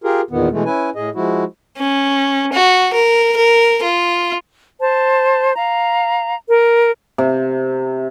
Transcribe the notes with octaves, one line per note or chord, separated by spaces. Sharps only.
F4 G4 G#4 A#4
E2 A#2 D#3 B3
B2 E3 G#3 A3
C#4 E4 B4 G#5
A2 G#4 D#5
F3 G#3 E4 F#4
C#4
F#4
A#4
A#4
F4
C5 A5
F5 A#5
A#4
C3